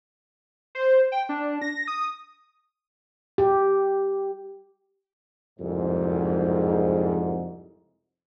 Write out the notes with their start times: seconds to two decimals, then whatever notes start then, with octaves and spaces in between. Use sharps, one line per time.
0.75 C5
1.12 G5
1.29 D4
1.62 A#6
1.88 D#6
3.38 G4
5.59 F#1 C2 F2 G#2